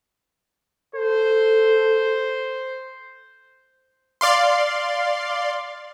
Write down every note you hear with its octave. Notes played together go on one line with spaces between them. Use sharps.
A4 C5
D5 F5 C6